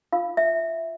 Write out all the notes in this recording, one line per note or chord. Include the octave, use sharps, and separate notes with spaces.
F4 F5
E5